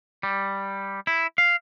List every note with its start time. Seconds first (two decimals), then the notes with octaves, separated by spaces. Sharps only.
0.23 G3
1.07 E4
1.38 F5